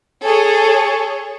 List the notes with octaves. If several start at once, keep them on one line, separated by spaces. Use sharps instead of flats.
G#4 A4 C#5